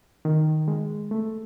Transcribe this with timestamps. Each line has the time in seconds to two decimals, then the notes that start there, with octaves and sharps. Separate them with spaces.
0.25 D#3
0.68 G#3
1.11 A3